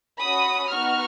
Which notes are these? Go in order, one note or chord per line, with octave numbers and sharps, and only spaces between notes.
C#4 F#4 B5 D#6
B3 D#4 F#4 C#6 F6